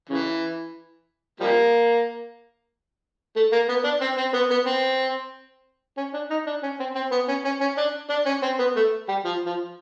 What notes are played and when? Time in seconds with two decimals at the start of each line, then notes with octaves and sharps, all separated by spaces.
0.09 C#3 E3
1.40 F3 G3 A#3
3.36 A3
3.52 A#3
3.69 B3
3.85 D4
4.01 C4
4.18 C4
4.34 B3
4.51 B3
4.67 C4
5.97 C#4
6.14 D4
6.30 D#4
6.47 D4
6.63 C#4
6.80 C4
6.95 C4
7.12 B3
7.28 C#4
7.45 C#4
7.61 C#4
7.78 D4
8.10 D4
8.26 C#4
8.43 C4
8.59 B3
8.76 A3
9.08 G3
9.25 F3
9.46 F3